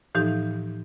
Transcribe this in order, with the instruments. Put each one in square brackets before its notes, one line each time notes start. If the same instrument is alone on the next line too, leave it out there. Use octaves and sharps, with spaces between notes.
[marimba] A2 E3 F3 D#4 G4